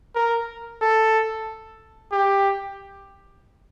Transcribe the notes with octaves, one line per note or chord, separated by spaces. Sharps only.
A#4
A4
G4